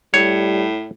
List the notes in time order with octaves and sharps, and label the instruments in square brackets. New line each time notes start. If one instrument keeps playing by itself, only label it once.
[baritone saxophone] A2 [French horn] G3 [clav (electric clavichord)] C#5